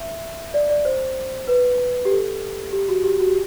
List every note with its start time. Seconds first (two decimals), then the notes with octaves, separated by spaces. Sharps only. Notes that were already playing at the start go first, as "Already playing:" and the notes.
Already playing: E5
0.54 D5
0.70 D5
0.85 C5
1.47 B4
2.05 G4
2.10 A4
2.73 G4
2.88 F#4
3.04 G4
3.20 F#4
3.28 G4